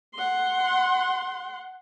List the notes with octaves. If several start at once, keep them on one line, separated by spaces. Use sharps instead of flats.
F#5 C6